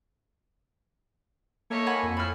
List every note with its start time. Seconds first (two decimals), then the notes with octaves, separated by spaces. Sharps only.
1.70 A3 A#3 D#4 C#5
1.86 F#5 G#5 B5
2.03 F2
2.17 A2 B5 F6